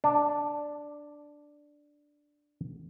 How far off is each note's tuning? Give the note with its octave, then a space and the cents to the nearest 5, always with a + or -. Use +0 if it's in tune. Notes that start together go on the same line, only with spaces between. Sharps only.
D4 +0